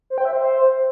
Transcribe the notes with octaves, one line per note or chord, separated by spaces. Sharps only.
C5
G5
E5
C5